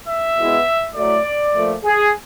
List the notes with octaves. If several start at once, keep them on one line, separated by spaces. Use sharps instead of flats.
E5
B2 G#3 B3 E4
A2 F#3 A3 D5
A#2 F3 A3
G#4